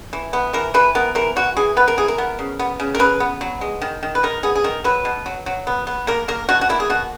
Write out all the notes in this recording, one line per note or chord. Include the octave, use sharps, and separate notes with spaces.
E3
B3
E3 A#4
E3 B4
B3 A#4
E3 A#4
E3 F#4
E3 G#4
B3 B4
A#4
E3 G#4
A#4
B3
C#3
B3
C#3
A#4
C#3 B4
B3
F#3
G#3
D#3
D#3
B4
D#3 A#4
B3 G#4
G#4
D#3 A#4
F#3 B4
B2
F#3
F#3
B3
B3
A#3 A#4
A#3 A#4
B2 F#4
F#4
A#3 E4
G#4
B2 F#4